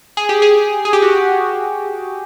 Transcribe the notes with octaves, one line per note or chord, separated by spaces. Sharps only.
G#4
G4
G#4
G#4
G4
F#4